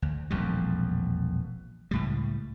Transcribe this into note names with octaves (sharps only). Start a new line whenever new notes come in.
D2
E1 A#1 F2 G3
C#2 A2 G3